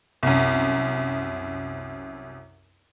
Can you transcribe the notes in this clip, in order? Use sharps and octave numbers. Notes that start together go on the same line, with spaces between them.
C2 F#2